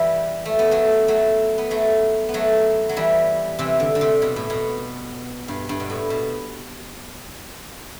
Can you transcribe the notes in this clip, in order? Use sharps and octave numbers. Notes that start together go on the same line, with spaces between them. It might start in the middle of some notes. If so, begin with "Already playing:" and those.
Already playing: E3 G3
A3
B3
F#3 A3
F#3 A3
B3
F#3 A3
B3
F#3 A3
F#3
E3 G3
C3 E3
D3
D3
C3
B2
A2
B2
G2
G2
B2
A2
B2